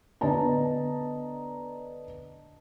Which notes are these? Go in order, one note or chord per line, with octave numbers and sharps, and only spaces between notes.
D3 B3 D#5 A5 A#5